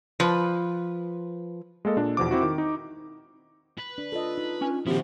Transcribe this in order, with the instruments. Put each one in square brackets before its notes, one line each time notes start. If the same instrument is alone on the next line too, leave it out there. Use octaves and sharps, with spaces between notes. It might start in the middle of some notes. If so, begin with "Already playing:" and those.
[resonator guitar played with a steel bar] F3 B4
[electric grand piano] G#3 A#3 A4 D#5
A#2 D4 A4
E2 B2 F3 D6
C4 E4 F#4
D#3
D#4
[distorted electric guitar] B4
[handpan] D4
[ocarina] F4 [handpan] A4 D#5
[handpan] D#4
[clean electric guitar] C#4 D4 G#5
[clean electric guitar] A#2 F3 [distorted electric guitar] D#3 E4 [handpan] C4 F#4 [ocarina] G4